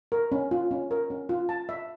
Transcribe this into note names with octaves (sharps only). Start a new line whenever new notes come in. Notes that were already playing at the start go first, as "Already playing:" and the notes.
A#4
C#4
F4
C#4
A#4
C#4
F4
A5
E5